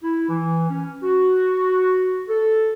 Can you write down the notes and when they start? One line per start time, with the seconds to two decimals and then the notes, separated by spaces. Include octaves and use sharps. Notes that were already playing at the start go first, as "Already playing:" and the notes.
0.02 E4
0.28 E3
0.68 C#4
1.03 F#4
2.28 A4